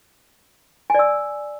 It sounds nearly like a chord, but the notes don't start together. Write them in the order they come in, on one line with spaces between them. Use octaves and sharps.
G#5 D5 E6